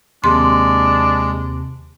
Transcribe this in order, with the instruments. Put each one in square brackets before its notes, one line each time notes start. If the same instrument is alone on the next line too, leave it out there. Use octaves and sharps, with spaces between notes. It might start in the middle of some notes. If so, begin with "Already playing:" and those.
[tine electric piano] D#2 C3 [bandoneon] G#3 [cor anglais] D4 [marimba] C6